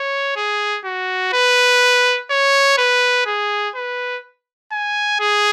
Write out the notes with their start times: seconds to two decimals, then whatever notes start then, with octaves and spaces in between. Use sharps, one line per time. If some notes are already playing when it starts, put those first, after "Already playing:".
Already playing: C#5
0.36 G#4
0.85 F#4
1.33 B4
2.30 C#5
2.78 B4
3.26 G#4
3.75 B4
4.72 G#5
5.20 G#4